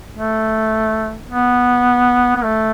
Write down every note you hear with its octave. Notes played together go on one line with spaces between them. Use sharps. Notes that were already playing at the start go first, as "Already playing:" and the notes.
A3
B3
B3
A3